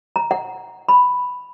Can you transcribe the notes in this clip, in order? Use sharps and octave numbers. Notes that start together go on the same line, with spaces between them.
A#5
F#5
B5